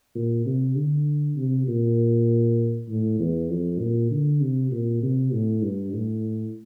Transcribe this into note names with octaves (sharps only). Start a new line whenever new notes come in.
A#2
C3
D3
C3
A#2
A2
E2
F2
A#2
D3
C3
A#2
C3
A2
G2
A2